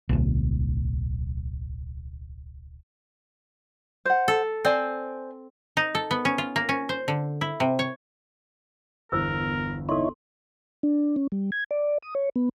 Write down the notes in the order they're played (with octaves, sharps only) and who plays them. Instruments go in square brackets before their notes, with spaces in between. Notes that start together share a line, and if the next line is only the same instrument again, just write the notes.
[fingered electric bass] D1 B1
[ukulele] C5 F#5
[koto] A4
[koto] C4 [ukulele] C5 D5 G#5
[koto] D#4
A4
B3
C#4
F4
A#3
C#4
C5
D3
E4
C3
C#5
[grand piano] G1 E2 [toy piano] E4 C5 E6 [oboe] A#4
[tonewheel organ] D#4 E4 C#5 [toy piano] A4 C6
[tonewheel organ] D4
C#4
G3
G#6
D5
D#6
C#5
B3